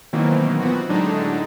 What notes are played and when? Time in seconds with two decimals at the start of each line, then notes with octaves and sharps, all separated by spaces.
0.13 B2 D#3 E3 F#3 A#3 C4
0.60 A#2 B3 C4 F#4
0.89 A2 D3 F#3 G#3 D4 D#4